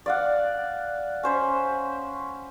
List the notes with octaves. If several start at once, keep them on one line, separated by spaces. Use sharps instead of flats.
D5 F5 F#5
C#4 C5 B5